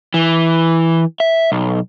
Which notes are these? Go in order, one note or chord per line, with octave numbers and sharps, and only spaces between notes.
E3
E5
B1